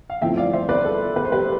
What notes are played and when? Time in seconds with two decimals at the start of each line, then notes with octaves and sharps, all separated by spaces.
0.10 F5
0.22 A2 F3 C4 E4 E5 G5
0.37 D5 F5
0.53 C5 E5
0.69 B4 D5
0.85 A4
1.16 B4
1.25 C5
1.32 G4 B4